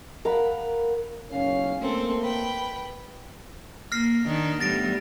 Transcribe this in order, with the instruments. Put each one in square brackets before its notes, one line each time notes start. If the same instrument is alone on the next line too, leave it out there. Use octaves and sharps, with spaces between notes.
[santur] A#4 F5 F#5 B5
[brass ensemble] F#1 B1 C#4 [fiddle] F5
[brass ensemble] A3 A#3 [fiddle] C4 A4
[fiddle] B4 G5
[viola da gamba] A#3 [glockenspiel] F6 A#6 C7
[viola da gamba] D#3 D4 D#4
[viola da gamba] A2 G3 B3 [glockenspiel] A6 A#6 D7